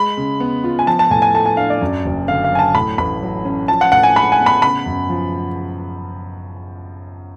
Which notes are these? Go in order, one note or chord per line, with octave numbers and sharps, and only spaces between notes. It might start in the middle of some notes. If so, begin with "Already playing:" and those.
Already playing: G#3 B5
C#3
B3
F4
G#5
F3 A5
A5
A2 G#5
G#5
A3 A5
G#5
D4 F5
D5
F#2
F#1
D3 F5
F5
F#3 G#5
A5
A2 B5
A1 B5
F#3
C#4
F3 A5
F#5
A2 F#5
G#5
G#3 B5
G#5
B3
B5
C#3 B5
F#2
F3